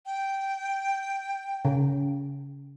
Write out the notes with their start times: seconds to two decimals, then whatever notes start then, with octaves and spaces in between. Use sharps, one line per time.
0.06 G5
1.65 C#3